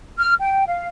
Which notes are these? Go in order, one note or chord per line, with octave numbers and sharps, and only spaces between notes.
F6
G5
F5